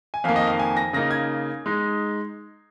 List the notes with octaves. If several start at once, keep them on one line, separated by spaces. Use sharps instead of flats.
G#5
F2 D#3 A#3 F5
D#5
F5
G#5
A#6
C#3 A#3 D#4 A#6
G#6
G#3 D#4